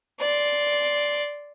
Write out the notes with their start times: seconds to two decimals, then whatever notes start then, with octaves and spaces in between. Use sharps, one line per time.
0.20 D5 C6